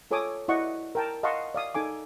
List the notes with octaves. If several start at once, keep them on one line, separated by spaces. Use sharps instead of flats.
F4 A4 C#5 G#5 D6 D#6
E4 F#4 D5 D#5 F#5 C#6
A#4 G5 A5
D#5 F5 F#5 A5 C6 C#6
D5 F5 D#6
D#4 A4 G#5 D6